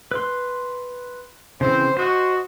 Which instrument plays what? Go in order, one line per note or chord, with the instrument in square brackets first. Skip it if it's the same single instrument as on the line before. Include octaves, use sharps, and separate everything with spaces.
[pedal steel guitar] B4 C6
[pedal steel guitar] C#3 E3 C4 [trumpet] C5
[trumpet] F#4 [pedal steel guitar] C5 D#5